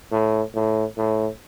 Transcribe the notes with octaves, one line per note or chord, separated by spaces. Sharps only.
A2
A2
A2